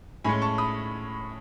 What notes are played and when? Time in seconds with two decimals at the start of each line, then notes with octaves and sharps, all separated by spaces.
0.24 A2 G#3 C#4 G#5 B5
0.42 A5 C#6
0.58 B5 D#6